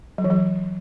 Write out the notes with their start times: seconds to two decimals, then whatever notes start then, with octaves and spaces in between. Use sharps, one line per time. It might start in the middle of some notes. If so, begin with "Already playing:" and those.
0.18 F#3
0.24 E3
0.30 F#3